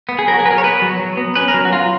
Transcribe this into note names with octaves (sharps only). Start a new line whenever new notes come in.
B3
G#4
F#3 A#4
F#4
G#4
F#3 B4
A#4
C#5
B3 B4
F#3
F#3
B3
C#4 B4
A#4
F#3
F#4
F#3 F4